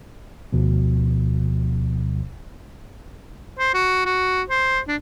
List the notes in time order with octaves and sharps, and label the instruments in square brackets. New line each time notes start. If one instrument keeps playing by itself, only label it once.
[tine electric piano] D2 B2 F3
[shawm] C5
F#4
F#4
C5
D4